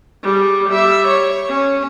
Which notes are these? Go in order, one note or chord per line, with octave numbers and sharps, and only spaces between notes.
G3 G#4
G3 E5
C#5
C#4